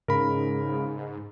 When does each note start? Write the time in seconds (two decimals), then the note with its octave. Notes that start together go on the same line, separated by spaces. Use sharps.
0.08 G#2 C#3 A#4 B5